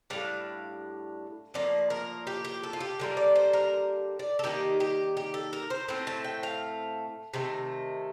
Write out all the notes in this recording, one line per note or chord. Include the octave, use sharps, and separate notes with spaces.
A2 G3 D4 F5
A2 F3 A#3 D5
A#4
G4
G4
A4
F4
G4
D3 G3 A#3 F4
D5
C5
A#4
D5
A4
D#3 G3 A#3 D#4 G4
G4
G4
A4
A#4
C5
A2 A3 C4 C5
A5
G5
F5
C3 D#3 A3